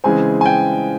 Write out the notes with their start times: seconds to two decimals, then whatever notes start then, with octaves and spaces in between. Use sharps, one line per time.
0.04 C#3 E3 G#3 C4 G#5
0.41 G#5
0.46 G5